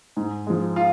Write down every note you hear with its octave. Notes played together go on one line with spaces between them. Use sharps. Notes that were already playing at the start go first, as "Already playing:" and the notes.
G#2
F3 G#3
F4